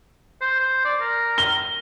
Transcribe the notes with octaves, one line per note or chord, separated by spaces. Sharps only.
C5
C5
D5
A#4
G7